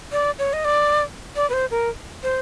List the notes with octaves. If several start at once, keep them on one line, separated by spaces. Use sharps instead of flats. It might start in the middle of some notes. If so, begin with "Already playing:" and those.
D5
C#5
D#5
D5
D5
B4
C5
A#4
C5